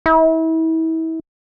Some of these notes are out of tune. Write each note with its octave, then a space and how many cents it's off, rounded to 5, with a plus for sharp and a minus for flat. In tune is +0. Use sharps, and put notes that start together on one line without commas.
E4 -35